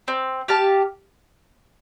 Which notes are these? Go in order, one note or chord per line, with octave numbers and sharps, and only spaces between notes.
C4
G4 F5 A5